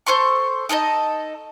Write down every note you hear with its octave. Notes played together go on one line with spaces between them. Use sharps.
A4 C5 C6 C#6
D#4 A4 D5 D#5